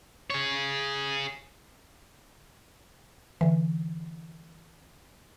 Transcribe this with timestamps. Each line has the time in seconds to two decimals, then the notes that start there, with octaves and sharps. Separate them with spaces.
0.30 G#4 C#5
3.41 D3 E3